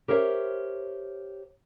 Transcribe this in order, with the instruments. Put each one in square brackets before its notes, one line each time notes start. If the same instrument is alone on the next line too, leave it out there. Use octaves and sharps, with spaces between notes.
[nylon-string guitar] G4 A#4 C5 C#5 E5